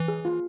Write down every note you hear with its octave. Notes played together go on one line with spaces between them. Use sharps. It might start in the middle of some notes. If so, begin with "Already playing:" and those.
Already playing: E3
G#4
F4